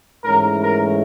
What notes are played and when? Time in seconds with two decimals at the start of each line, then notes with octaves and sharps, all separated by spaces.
0.25 G#2 E3 A3 C#4 A#4
0.61 A#4